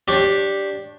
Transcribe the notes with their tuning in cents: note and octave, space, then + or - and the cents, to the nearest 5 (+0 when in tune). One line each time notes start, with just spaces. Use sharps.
D4 +0 G4 +0 C#5 -20